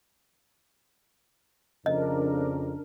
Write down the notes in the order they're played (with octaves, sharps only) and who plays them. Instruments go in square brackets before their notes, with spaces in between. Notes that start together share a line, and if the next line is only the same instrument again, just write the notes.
[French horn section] F2 [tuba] C#3 [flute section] D4 A#4 [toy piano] D#5